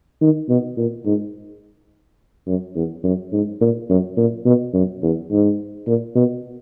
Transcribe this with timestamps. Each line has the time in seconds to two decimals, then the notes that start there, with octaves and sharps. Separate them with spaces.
0.21 D#3
0.49 B2
0.77 A#2
1.06 G#2
2.47 F#2
2.75 E2
3.04 F#2
3.33 G#2
3.61 A#2
3.90 F#2
4.17 A#2
4.45 B2
4.74 F#2
5.03 E2
5.31 G#2
5.87 A#2
6.15 B2